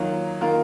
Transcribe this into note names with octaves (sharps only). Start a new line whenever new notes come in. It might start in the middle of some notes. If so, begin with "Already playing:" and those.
Already playing: D#3 F#3 A#3 F4
D#3 A#3 F4 A#4